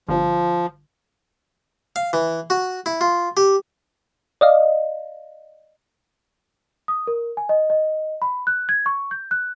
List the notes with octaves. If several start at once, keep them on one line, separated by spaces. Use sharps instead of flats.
G1 F3
F5
E3
F#4
E4
F4
G4
D5 D#5 F5
D#6
A#4
G#5
D#5
D#5
B5
F#6
G#6
C#6
G6
F#6